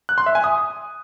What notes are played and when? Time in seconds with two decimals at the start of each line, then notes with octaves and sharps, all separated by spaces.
0.09 F#6
0.18 C6
0.26 E5
0.35 G#5
0.44 D#6